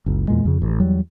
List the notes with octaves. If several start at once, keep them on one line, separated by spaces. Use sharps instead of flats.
F#1 C#2
E2 A#2 G#3
F2 C#3
A1
E2 F#3 G3